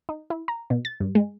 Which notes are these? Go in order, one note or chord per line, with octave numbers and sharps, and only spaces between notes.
D#4
E4
A#5
B2
A6
G2
G#3